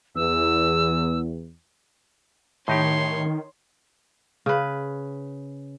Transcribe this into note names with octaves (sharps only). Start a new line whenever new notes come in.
E2 E6
A2 D#3 D#4 G4 C#5 C6
C#3 B4